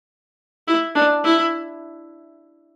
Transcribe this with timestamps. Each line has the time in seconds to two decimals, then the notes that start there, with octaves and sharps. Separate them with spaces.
0.67 E4
0.95 D4
1.24 E4